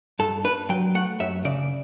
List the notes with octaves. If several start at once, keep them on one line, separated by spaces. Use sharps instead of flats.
G2 A4
D4 B4
F#3 G5
A3 F#5
F#2 E5
C#3 D5